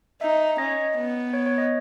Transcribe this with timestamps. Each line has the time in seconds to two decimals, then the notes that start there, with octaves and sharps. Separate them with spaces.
0.21 D#4 E5
0.58 C#4 D#5
0.97 B3
1.33 C#5
1.46 C#5
1.58 D#5